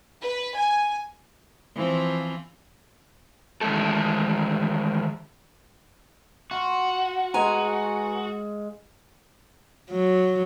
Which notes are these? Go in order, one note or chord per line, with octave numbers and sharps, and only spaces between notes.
B4
G#5
E3 F3 C4
D#3 E3 G#3 A3 A4
F4 F#4
G#3 B4 G#5 A#5
F#3